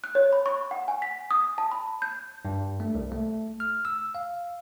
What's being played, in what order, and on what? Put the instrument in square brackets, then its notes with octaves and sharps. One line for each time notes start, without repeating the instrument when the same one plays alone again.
[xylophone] F#6
C#5
B5
C#6
F#5
G#5
B6
D#6
A5
B5
G6
[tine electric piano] G2
A3
C2
A3
F6
E6
F5